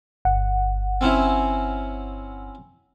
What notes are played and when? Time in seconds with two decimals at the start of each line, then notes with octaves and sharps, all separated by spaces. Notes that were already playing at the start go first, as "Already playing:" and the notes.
0.25 G1 F#5
1.01 C4 C#4 E4